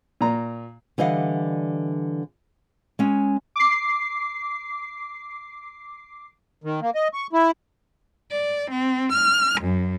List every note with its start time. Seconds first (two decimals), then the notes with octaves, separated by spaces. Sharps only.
0.21 A#2 A#5
0.98 D3 E3 G3 D#5 F5 F#5
2.99 G#3 C#4
3.56 D6 C7
6.64 D#3
6.81 A#3
6.95 D#5
7.13 C#6
7.33 E4
8.32 D5
8.72 C4
9.14 F6
9.62 F#2